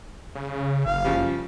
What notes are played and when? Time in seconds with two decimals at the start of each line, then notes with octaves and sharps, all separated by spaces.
0.35 C#3
0.86 F#1 F5
1.04 C#3 F3 G3